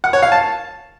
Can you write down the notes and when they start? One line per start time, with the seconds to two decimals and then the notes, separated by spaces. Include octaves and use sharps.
0.04 F#5
0.13 C#5
0.22 F5
0.32 A5